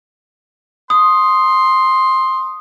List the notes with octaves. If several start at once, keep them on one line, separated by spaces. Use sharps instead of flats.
C6 D#6